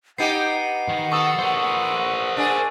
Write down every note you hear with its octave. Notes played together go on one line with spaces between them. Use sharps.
B3 D#4 G4 F#5 C7 D#7
D#3
B3 A4 C#6 D#6 E6
A#4 C5
D4 G#4